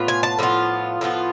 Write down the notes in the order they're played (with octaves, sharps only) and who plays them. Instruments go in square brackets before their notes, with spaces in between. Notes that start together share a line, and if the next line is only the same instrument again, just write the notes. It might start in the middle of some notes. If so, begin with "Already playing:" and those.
Already playing: [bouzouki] A2 B3 F4
G#5
A5
A2 F3 B3 F4
A2 F3 B3 F4